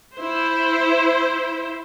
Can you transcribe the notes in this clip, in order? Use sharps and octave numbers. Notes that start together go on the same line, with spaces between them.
E4 C5